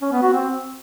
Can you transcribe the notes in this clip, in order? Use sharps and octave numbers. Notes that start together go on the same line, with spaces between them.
C#4
B3
F#4
C4